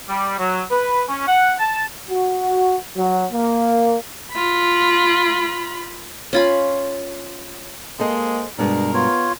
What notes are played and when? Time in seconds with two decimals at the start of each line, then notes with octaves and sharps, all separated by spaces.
0.09 G3
0.39 F#3
0.71 B4
1.09 C#4
1.28 F#5
1.60 A5
2.10 F#4
2.96 F#3
3.32 A#3
4.33 F4 B5
6.33 C#4 F4 B5
8.00 G#3 A#3 A4 C5 D#5
8.58 G2 B2 G#3 D4 A#4
8.94 B3 F4 C#5